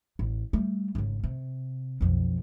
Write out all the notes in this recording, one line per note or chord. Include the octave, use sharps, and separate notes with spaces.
A1
G3 A3
G#1 C#3
C3
B1 F2